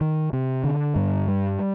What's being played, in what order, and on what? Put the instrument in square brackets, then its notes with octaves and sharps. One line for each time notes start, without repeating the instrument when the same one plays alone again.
[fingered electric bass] D#3
C3
D3
G2
G3